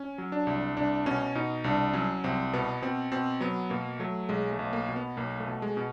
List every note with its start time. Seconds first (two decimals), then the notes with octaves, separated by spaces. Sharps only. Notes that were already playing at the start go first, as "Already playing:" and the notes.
Already playing: C#4
0.18 F#3
0.32 D4
0.47 C2
0.77 C2 D4
1.06 B2 C#4
1.35 B2 D#4
1.64 C2 D4
1.93 F#3 C#4
2.24 C2 C4
2.54 B2 B3
2.82 B2 C4
3.12 B2 C4
3.41 F#3 B3
3.70 B2 A#3
3.99 F#3 A3
4.29 B1 G#3
4.52 A3
4.59 B1
4.73 A#3
4.89 B2
4.96 B3
5.17 B1 A#3
5.40 A3
5.48 B2
5.62 G#3
5.77 B2